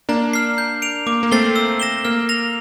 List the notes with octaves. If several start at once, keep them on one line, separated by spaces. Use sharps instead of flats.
A#3 D4 A#5
F6 C7
G6
D7 F7
A#3 D6
A#3
A3 C4 A6 C7 G7
E6
A#6 E7 G7
A#3 F6
A#6 F7